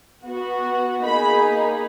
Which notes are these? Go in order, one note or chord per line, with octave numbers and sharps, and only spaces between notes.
B3 F#4
A#3 D#4 G#4 B5